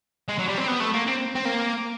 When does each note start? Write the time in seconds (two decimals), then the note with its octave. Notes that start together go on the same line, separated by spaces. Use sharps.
0.29 G#3
0.38 F#3
0.48 G3
0.58 C4
0.68 B3
0.80 A3
0.93 A#3
1.07 C4
1.35 C4
1.45 A#3